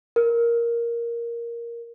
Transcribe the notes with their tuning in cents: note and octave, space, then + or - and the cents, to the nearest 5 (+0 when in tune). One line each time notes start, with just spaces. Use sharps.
A#4 +5